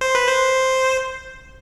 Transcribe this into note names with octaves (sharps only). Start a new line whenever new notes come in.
C5
B4
C5